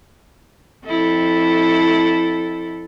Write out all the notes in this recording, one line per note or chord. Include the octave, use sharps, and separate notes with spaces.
F2 E4 A4